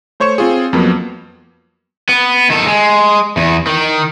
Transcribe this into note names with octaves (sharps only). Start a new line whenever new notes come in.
A3 C5 C#5 C#6 C#7 E7
C4 F4 G#4
F2 F3 F#3 A#3 B3
B3
D#3 A4
G#3
E2
D#3